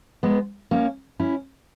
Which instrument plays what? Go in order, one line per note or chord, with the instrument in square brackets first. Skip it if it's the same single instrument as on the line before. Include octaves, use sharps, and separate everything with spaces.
[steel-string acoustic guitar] G#3 B3
A#3 C#4
C#4 E4